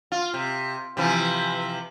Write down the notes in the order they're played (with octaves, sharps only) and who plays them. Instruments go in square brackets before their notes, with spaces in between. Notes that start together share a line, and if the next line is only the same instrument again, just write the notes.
[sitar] F4
C3
C3 E3 F3